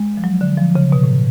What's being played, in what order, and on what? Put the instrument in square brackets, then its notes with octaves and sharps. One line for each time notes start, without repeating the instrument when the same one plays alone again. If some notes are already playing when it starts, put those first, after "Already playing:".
Already playing: [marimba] G#3
F3
F#3
D3
F3
C#3
B2
A2